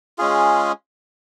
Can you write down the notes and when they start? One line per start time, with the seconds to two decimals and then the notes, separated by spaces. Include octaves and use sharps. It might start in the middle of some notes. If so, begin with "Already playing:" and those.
0.18 G#3 C#4 F4 G#4